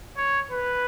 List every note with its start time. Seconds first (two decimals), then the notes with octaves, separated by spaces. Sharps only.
0.17 C#5
0.51 B4